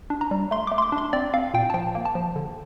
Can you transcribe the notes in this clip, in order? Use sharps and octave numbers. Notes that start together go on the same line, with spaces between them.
D4
A#5
G3
A3 C6
A3 D6
C6
D6
D4
C6
C4 D5
C4 F5
A#2 G5
A5
F3 G5
A#3
A5
F3
D3